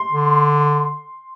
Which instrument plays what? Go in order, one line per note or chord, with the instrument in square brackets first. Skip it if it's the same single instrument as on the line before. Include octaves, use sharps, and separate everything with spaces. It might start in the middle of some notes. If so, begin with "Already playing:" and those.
Already playing: [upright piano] C6
[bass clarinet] D3